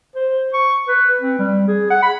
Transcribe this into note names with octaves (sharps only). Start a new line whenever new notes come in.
C5
C#6
B4
C4
G3
G#4
F#5
B5